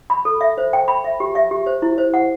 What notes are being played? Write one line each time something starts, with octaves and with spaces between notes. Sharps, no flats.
B5
A4
E5
C5
G5
B5
E5
G4
E5
G4
C5
E4
C5
F#5